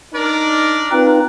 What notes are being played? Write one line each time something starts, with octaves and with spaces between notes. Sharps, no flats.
D4 D#4 A#4 D5
C4 D#4 F4 B4